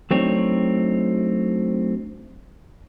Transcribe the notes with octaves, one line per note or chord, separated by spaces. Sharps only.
F#3 A3 C4 D4 D#4 C#5